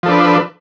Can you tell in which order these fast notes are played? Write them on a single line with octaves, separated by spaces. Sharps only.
F3 A4 D4 B4